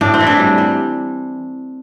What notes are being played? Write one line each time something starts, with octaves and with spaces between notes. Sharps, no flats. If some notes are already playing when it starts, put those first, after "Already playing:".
A2 D4
C4
E3
D4
G3
G3